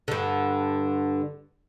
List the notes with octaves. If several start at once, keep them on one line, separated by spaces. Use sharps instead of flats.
G2 D3